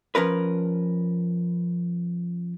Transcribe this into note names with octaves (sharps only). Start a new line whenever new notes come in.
F3 C#4 A#4 B4